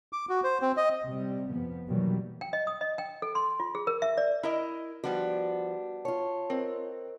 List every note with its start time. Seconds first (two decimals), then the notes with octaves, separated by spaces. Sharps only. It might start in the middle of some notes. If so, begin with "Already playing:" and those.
0.13 D6
0.29 F#4
0.44 C5
0.62 C4
0.77 D#5
1.04 C3 G3
1.52 F2 F3 B3
1.88 B2 D#3 E3 F#3 G3 A#3
2.41 G5
2.53 D#5
2.67 D#6
2.81 D#5
2.98 G5
3.22 A4
3.35 C6
3.60 F4
3.75 G#4
3.87 A#4
4.02 E5
4.17 D5
4.43 E4 A#4 D#5
5.04 F3 G3 B3 D4 F#4
6.05 F4 C#5 A5
6.50 C4 A#4 C5 D#5